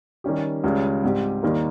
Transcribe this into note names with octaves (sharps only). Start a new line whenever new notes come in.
D#3 G3 C#4 G4
C#2 C#3 G3
G#2 G3 C4 G4
D#2 D#3 G3 A#3